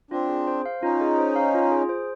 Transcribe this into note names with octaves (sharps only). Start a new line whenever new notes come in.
C4 D4 F4
G#4
C5
F5
C#4 D#4 F4
G#4
C5
F5
F4
G#4
C5